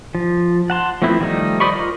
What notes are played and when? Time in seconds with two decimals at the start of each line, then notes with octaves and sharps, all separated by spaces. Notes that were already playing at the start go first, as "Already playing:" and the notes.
0.15 F3
0.70 F#5 A5 C6
1.02 F3 A3 B3 C4 E4
1.20 D#3 F3 G3 A3 D#4
1.60 C5 D5 D#5 B5 C#6
1.73 F4 A#4